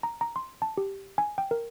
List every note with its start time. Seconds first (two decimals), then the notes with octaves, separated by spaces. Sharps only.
0.03 A#5
0.21 A#5
0.36 C6
0.62 A5
0.77 G4
1.18 G#5
1.38 G5
1.51 A#4